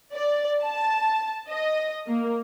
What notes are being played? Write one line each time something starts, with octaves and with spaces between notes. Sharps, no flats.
D5
A5
D#5
A#3